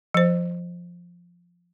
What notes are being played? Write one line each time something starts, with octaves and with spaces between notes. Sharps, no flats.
F3 C5